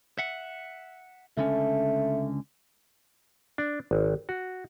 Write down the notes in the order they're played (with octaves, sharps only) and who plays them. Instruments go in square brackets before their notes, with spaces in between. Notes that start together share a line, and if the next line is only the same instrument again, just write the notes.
[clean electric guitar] E5 F#5
[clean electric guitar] C#2 D3 C#4 [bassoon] A3
[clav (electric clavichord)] D4
G#1
F#4